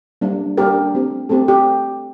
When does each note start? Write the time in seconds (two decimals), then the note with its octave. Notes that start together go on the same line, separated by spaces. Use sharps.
0.21 G3 A#3 D4
0.58 G3 A#3 D4 G4 A#4
0.94 A3 C4 G4
1.29 A3 C4 G4 A4
1.48 G4